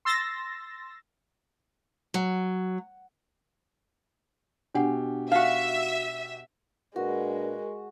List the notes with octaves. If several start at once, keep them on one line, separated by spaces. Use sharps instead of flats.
C6 E6 A6 A#6
F#3
B2 D4 G4 F#5 G#5
D#4 F#4 E5 F5
A#2 G#3 D4 F#4 A#4 B4